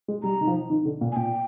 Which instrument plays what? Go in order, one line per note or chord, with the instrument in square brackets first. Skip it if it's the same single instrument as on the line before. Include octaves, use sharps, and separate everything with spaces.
[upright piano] G#3
[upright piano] G3 [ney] A#5
[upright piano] D#3
F3
D#3
D3
A#2
[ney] G#5
[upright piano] A#2 [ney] G5